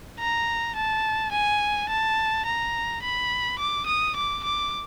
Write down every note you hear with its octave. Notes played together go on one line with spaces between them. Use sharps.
A#5
A5
G#5
A5
A#5
B5
D6
D#6
D6
D6